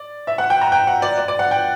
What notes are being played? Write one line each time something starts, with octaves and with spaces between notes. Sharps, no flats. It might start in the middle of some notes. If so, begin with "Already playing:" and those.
Already playing: D5
E5
F#5
G5
A#5
G5
F#5
D5
D5
D5
F#5
G5